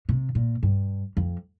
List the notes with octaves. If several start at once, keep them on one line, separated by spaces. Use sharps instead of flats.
C3
A#2
G2
F2